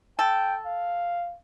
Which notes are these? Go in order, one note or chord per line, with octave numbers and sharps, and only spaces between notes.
A4 G5
F5